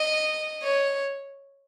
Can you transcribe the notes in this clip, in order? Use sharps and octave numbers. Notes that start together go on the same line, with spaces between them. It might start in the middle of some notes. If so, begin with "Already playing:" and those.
Already playing: D#5
C#5